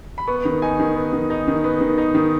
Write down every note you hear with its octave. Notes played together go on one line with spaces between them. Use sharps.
B5
B3 C#6
D#3
D#4 G#5
D#3
B3
D#3
D#4
D#3
B3
D#3
D#4
D#3